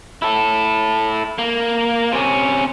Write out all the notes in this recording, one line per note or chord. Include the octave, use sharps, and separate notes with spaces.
E4 A4
A#3
C3 C#4